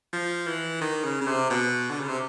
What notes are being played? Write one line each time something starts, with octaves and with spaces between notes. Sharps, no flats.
F3
E3
D#3
C#3
C#3
C3
B2
D3
C#3
C3